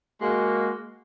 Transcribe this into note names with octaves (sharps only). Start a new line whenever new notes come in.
G#3 A#3 F#4